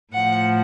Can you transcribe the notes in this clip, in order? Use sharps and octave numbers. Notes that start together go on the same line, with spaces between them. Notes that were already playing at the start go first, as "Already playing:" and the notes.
A2 F3 F#5